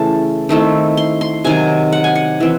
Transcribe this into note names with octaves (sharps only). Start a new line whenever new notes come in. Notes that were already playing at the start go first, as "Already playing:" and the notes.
Already playing: C#3 E3 A3 A5
D#3 A3 C4 E4
C6
C6
C3 D#3 F#3 G#5
F#5
G#5
F#5
E3 C4